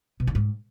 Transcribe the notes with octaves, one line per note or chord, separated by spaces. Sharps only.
B2
D#3
G#2